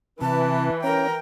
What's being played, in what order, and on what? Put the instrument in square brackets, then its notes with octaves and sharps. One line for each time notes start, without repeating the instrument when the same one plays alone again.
[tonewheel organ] C3 [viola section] E3 [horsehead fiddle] B4 [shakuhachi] A5
[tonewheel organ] C#4 [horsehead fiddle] A#4 G5 [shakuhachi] A#5